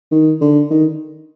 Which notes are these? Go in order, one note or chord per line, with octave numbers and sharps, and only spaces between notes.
D#3
D3
D#3